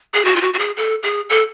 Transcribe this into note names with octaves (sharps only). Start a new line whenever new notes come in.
G#4
F#4
F4
F#4
F#4
G#4
A4
G#4
A4